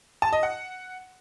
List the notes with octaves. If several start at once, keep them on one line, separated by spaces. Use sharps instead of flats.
A5
D#5
F#5